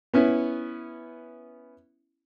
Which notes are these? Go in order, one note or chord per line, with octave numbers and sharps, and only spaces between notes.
B3 C#4 E4